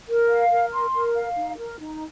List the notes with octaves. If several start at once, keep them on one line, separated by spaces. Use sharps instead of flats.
A#4
F5
A#4
C6
A#4
F5
D#4
A#4
D#4